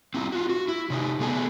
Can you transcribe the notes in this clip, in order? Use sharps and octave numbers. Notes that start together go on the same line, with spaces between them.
C4 E4 F4
F4 F#4
F#4
E4
C3 D#4 F#4 G4
A3 B3 G#4 A4